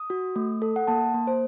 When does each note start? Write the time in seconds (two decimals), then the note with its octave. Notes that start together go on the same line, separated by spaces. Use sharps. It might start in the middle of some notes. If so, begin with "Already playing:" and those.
Already playing: D#6
0.10 F#4
0.36 A3
0.62 A4
0.76 F#5
0.87 A#3 A5
1.14 A#3
1.27 C5